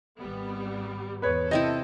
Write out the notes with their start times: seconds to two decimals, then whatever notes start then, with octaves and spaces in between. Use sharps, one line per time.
0.18 G#1 G3 B3
1.22 E2 G#3 B4 C#5
1.51 C3 C4 E4 A4 D#5